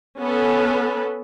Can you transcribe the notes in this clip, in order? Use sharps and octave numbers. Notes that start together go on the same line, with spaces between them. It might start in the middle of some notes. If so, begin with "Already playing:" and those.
B3 C#4 A4 B4